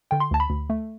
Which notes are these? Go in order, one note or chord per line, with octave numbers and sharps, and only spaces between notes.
D3 G5
C6
D2 A5
B5
D2
A3